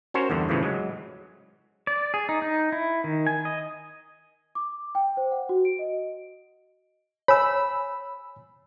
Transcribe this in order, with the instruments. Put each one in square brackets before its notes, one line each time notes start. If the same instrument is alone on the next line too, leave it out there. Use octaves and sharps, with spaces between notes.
[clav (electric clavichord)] C#4 F#4 A#4 C5 C#5
E2 G2 D3
A2 C#3 E3 F3
F#3 G#3
[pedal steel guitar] D5
G#4
D#4
D#4
E4
D#3
G#5
D#5
[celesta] D6
G5
C5
F#5
F#4
D7
D#5
[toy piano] C#5 G#5 [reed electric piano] B5 E6